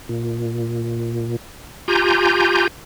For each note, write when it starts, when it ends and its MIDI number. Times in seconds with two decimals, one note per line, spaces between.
0.09 1.36 46
1.88 2.67 65
1.88 2.67 67
1.88 2.67 80
1.88 2.67 82
1.88 2.67 91